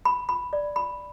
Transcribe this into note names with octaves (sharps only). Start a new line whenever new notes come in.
B5
B5
D5
B5